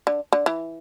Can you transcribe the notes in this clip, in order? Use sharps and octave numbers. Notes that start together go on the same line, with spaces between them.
D3
D3
E3